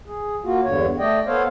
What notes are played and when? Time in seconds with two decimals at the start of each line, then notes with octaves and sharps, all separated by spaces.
0.06 G#4
0.44 A#3 F4 F#4
0.63 E2 G2 D3 C#5
0.99 A3 D5 D#5 G5
1.26 B3 A4 C5 C#5 F5